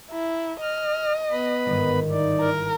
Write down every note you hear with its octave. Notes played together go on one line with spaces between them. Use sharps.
E4 A#5
D#5 F6
B3 B4 B5
G1 G#2 D#3
D#4 E4 D5
A#4